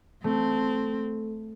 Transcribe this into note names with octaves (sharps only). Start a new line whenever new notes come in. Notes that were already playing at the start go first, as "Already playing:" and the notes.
A3 C4